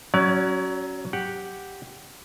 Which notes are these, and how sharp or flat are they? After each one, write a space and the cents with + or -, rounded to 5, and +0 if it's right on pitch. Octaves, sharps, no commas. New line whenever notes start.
F#3 +10 C#4 +0 D5 -40
G4 +0 F#5 +0